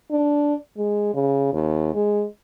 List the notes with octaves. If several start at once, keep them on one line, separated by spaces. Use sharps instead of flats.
D4
G#3
C#3
D#2
G#3